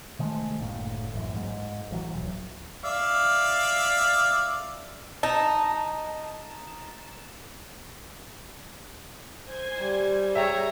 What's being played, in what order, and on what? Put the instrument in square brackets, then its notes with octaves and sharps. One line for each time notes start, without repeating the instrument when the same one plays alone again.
[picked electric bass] C3 D#3 G#3 A3
F#1 D2 A2 A#3
A1 F#2
G#2
A1 E3 F#3
D#1 B1
[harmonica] D5 E5 F5
[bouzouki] D#4 [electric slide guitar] A5
[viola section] C5 G#5
[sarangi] G3
[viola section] G#4 C#5 A#5 [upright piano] E5 G5